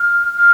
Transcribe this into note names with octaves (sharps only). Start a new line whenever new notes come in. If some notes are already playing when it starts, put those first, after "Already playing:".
Already playing: F6
F6